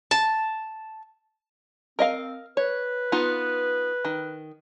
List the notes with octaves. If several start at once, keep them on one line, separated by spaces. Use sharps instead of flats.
A5
C4 A#4 D#5 F5
B4 C#5
B3 D#4 F4
D#3